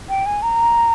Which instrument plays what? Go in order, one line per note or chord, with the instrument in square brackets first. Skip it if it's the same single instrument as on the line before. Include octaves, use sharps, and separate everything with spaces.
[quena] G5
G#5
A#5